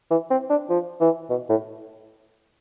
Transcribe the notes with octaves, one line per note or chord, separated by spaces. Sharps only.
E3
C4
D4
F3
E3
B2
A2